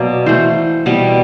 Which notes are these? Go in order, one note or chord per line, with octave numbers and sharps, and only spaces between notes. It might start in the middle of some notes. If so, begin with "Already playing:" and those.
Already playing: B2 F#3 A#3 D5
E3 A3 C5
B2 G3 B3